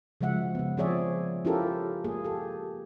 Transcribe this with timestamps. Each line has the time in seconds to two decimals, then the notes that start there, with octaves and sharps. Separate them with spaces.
0.21 C#3 F3 G#3 E5 F#5
0.55 C#3 B3
0.77 F3 C4 G#4 C#5 D5 E5
1.45 C#4 E4 F4 G4 A4 A#4
2.05 A#3 G#4
2.24 G4 A4